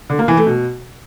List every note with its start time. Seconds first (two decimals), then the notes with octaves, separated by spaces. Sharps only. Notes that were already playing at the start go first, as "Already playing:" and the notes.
0.10 D3
0.19 A#3
0.28 E3
0.37 A3
0.47 B2